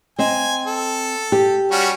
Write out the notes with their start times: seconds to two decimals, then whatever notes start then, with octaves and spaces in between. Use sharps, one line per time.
0.19 C4 D#5 G#5
0.66 A4
1.32 G4
1.71 G3 C#4 F#4